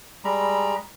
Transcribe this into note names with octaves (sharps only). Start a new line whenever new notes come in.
G3 G#3 A#5 B5